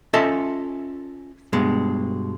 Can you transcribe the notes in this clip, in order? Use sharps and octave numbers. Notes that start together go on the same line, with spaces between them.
C#4 F4 A4 D#5 E5 A5
G2 B2 G#3